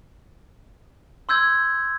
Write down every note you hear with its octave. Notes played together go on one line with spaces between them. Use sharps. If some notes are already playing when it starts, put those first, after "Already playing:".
C6 E6 G6 G#6